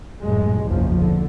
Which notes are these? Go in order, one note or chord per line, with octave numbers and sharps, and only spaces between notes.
A#1 F#2 A2 G3 G#3
F#1 B1 E2 C#3 F3
D3